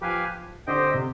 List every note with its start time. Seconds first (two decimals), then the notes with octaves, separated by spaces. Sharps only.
0.01 F3 G4 B4 F5 G#5
0.67 D3 C4 G4 C5 D#5 G5
0.94 C3